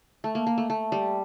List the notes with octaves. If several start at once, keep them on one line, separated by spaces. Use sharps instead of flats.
A3
A#3
A#3
A3
A3
G3